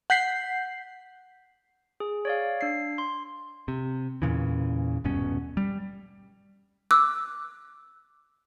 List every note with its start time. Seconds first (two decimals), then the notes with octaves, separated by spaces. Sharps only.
0.10 F#5 G6 B6 C7
2.00 G#4
2.25 C#5 D5 F5
2.61 D4 C7
2.98 C6
3.68 C3
4.22 E2 A#2 C#3 E3
5.04 D#1 G2 B2 C#4
5.57 G3
6.91 D6 E6 F#6